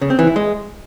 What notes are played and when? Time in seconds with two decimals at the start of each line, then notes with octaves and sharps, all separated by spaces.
0.01 C#3
0.10 C4
0.19 E3
0.27 E4
0.36 G#3